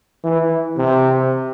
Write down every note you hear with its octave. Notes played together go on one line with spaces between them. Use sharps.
E3
C3